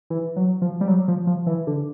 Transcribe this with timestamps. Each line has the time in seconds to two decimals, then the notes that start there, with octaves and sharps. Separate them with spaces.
0.10 E3
0.36 F#3
0.62 F3
0.81 G3
0.88 F#3
1.08 F3
1.27 F3
1.47 E3
1.67 D3